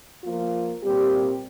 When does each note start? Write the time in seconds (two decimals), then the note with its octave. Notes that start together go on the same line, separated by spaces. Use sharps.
0.23 F3 A#3 F4
0.83 A#2 G3 C4 G4